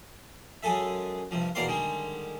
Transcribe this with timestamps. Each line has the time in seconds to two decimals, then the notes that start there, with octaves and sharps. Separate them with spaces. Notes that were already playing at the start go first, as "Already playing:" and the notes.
0.63 F#2 G#3 G#4 A4 E5
1.31 G2 C3 F3
1.55 E2 B2 A#4 D5 F5 C6
1.68 D3 D#3 G3 G#3